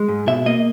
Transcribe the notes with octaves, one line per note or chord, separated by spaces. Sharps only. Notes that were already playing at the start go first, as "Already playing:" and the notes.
Already playing: G#3
G#2
B2 E5
A#3 D#5